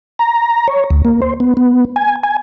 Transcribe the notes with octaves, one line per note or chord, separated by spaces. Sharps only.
A#5
C#5
D2
A#3
C5
B3
B3
G#5
G#5